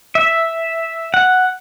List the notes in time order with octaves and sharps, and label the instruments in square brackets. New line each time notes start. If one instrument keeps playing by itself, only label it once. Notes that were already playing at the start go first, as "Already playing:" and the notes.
[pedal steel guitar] E5
F#5